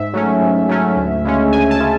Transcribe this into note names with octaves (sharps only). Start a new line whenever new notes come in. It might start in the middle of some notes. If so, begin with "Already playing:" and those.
Already playing: G#2 E5
F#3 A3 C#4
G#2
F#3 A3 C#4
D2
C#3 G#3 C#4
D2 G#5
A5
C#3 G#3 C#4